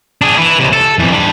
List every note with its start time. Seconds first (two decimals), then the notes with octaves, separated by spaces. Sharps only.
0.22 D4 G#4
0.37 E4 B4
0.59 C#2 C3
0.73 A4
0.99 F2 E3
1.13 D4 B5